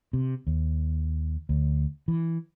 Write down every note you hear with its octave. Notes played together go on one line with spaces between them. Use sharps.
C3
D#2
D2
E3